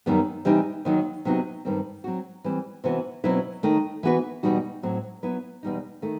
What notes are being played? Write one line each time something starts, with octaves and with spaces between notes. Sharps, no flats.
F#2 D#3 G3 B3
C3 E3 G3 D#4 G4
D#2 D#3 F#3
C3 F#3 B3 D#4 F#4
G2 D#3 G3 C4
F#3 C4 F#4
E3 G3 C4
C3 E3 B3 F#4
B2 F#3 C4 E4 B4
D#2 D#3 A3
E3 B3 F#4 B4
E2 B2 G3 D#4 F#4
A2 F#3 C4
F#3 B3 E4 B4
E2 B2 G3 D#4
D#3 A3